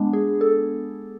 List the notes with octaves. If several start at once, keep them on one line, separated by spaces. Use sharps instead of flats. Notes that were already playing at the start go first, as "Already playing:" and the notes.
Already playing: G#3 B3 D4
G#4
A4